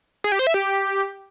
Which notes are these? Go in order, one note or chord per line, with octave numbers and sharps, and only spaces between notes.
G#4
G4
C5
E5
G4